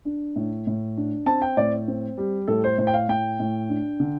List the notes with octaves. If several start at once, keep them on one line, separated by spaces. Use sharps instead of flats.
D4
A2
A2
D4
C4 A5
G5
A2 D5
C4
G3
A2 A4
C5
A2 C5
G5
F5
A2 G5
A2
D4
D3